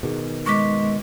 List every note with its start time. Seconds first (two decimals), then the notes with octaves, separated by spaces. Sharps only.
0.03 B2 D#3 G#4
0.46 G#3 C#6 D6 B6